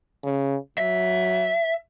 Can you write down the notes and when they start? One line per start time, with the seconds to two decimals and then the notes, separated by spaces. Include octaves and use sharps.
0.24 C#3
0.78 F#3 E5